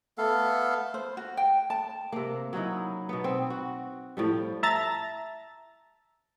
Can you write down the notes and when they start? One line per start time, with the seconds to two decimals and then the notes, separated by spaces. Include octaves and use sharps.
0.18 A3 B3 A4 F5
0.94 C5
1.17 F#4
1.37 G5
1.70 A5
2.12 C3 A#3
2.53 F#3 C#4 D#4 E4
3.09 B2 B3
3.24 C4
3.50 F#4
4.17 A2 F3 G3
4.63 E5 A5 A#5 A6